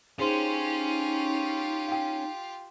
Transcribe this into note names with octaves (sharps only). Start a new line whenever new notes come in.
C#4 D#4 F4 G4 G#4 C5 C6
F5 G5